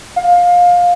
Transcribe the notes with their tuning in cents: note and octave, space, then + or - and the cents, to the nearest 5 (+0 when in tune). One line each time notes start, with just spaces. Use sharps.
F5 +20